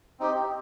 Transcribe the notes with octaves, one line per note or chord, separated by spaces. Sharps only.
C4 D#4 G4